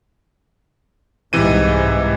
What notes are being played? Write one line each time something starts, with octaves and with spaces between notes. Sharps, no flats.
C2 G#2 C3 E3 D#7